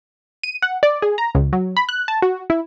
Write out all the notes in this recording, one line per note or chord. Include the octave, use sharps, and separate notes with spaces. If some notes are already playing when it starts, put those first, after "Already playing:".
D#7
F#5
D5
G#4
A#5
C#2
F#3
B5
F#6
A5
F#4
E4